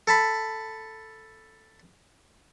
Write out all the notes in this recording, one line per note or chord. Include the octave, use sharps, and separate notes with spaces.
A4 A5 B5